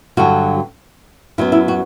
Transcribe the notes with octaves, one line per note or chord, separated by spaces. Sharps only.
G2 D3 F#3 F#4
F#2 F#3 B3 E4
E4
F#4